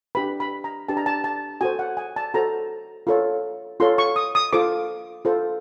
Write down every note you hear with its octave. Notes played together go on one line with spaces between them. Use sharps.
D4 G4 B4 B5
B5
A#5
D4 G4 B4 A5
A#5
A5
A5
F#4 A4 C5 G#5
F#5
G#5
A5
F#4 A4 C5 A#5
F4 A4 C#5
F4 A4 C#5 C6
C#6
D#6
D#6
F4 A4 C5 D6
F4 A4 C5